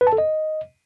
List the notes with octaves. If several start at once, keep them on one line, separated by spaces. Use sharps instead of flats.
B4
A5
A4
D#5